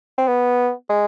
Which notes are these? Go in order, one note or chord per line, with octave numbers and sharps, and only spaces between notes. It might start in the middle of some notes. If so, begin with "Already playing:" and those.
C4
B3
G#3